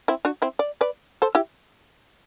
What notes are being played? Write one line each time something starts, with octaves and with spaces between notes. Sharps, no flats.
C4 E4
D4 F#4
C4 E4
D5
B4 D5
A4 C5
E4 G4